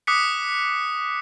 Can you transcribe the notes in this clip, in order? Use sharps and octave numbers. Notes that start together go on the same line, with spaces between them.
D6 D#6 F#6 B6 C#7